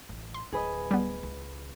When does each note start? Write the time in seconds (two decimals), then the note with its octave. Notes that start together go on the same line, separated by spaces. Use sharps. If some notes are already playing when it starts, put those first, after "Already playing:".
0.09 A1
0.34 C6
0.52 D1 G#4 B4 D#5
0.91 G3 B3
1.23 C#2